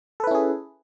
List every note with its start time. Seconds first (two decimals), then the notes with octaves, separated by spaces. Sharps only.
0.20 A4
0.24 B4
0.27 E4
0.31 C#4
0.35 G#4